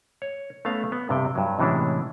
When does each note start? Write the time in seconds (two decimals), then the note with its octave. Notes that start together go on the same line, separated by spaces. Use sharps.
0.22 C#5
0.65 A3 B3 C#4 F5
0.92 B3
1.09 G2 C3 G5
1.35 G2 F#3
1.59 A2 C3 E3 G#3 C#4 D4